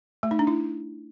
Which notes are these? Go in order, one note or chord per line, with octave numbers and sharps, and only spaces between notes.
A3
D#4
D4
E4